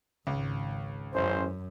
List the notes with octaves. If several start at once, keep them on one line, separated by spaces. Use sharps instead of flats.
G#1 C#2
A1 F#2 C#4 C5